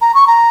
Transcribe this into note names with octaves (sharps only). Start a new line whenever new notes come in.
A#5
C#6
A#5